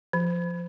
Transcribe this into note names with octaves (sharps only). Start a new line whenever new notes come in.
F3